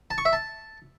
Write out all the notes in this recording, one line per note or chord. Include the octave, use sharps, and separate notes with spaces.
A5
C#6
E5
A5